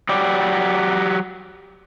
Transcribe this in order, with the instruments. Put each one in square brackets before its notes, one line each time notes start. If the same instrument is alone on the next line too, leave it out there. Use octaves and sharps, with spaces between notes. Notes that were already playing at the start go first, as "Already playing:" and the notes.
[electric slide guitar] F#3 G4 D5